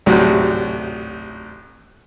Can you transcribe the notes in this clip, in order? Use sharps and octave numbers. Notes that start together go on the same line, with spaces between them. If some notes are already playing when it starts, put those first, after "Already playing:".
A1 D2 G#2 C3 F#3